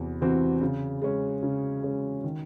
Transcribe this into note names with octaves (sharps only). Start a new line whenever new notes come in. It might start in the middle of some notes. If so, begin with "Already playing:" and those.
Already playing: E2 C3 E3 C4 F#4
C3 E3 C4 F#4
C#3
G#3 C#4
C#3
G#3 C#4
D#3